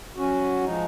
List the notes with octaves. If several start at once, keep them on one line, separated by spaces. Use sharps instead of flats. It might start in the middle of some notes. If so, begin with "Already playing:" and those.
F#3 C#4 F#4
F3 G#3 D#4